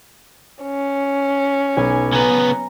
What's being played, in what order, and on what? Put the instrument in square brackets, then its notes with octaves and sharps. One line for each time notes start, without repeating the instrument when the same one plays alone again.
[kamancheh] C#4
[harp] B1 G#5 D#7
[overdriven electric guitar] C#3 B3 [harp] A#5